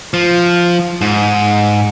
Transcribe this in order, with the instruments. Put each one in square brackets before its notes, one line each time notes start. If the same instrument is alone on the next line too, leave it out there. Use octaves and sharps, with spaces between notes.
[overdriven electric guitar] F3
G#2